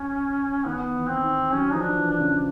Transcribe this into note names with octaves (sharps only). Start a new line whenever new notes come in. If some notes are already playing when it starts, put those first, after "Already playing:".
Already playing: C#4
D#3 B3
E3
C4
D#3
F#3 C#4
F3 D#4
D4
E3
D4
C#3